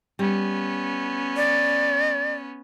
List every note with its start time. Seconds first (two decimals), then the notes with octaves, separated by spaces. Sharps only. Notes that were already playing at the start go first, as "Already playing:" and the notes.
0.19 G3 B3 C#4
1.36 D5